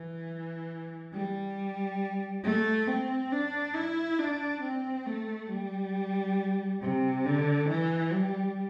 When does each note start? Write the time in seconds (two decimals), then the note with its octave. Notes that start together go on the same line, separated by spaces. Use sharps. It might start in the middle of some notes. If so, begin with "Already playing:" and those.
Already playing: E3
1.13 G3
2.44 A3
2.88 C4
3.32 D4
3.75 E4
4.19 D4
4.63 C4
5.07 A3
5.50 G3
6.82 C3
7.25 D3
7.69 E3
8.13 G3